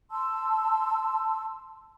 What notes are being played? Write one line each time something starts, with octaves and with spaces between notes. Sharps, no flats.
A5 C6 E6